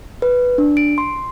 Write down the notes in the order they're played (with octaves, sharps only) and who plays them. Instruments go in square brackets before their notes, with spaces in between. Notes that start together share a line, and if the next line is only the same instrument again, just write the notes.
[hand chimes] B4
D4
D7
C6